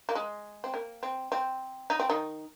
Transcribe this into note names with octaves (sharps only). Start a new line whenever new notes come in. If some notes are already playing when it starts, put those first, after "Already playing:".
A#3
G#3
C4
A#3
C4
C4
D#4
C4
D#3 D#4